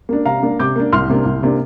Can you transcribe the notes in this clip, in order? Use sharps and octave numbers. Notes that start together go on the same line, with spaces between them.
A#3 D4
C3 F5 A#5
A#3 D4
C3 D6 G6
A#3 D4
C2 C6 F6
C3 A#3 D4
C2
C3 A#3 D4